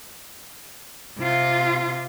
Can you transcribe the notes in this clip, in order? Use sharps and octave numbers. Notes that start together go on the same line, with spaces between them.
C3 F4